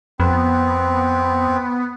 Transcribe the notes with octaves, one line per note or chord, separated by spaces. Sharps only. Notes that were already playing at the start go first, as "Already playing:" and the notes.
F2 B3 C4